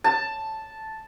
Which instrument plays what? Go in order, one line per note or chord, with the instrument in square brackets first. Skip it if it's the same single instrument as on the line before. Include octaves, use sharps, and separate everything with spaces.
[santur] A5